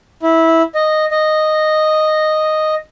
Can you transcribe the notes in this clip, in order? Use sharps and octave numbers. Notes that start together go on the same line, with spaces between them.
E4
D#5
D#5